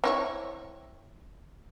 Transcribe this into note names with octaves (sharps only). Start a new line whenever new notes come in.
C4 E4 C#5